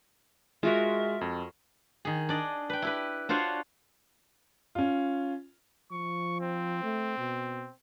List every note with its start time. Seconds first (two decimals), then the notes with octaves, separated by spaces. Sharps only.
0.63 G#3 F4 F#4 A#4 E5
1.21 F2
2.05 D#3 G#4
2.29 D4 D5 D#5
2.70 B4 G5
2.82 E4 G4 B4
3.29 D4 F4 F#4 C5 C#5
4.75 C#4 F4
5.91 F3 C#6
6.40 C4
6.83 A3
7.18 B2